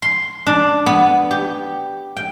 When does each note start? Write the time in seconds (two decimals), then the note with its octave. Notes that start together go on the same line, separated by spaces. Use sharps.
0.02 C6
0.47 D4
0.86 B3
1.31 G4
2.17 G5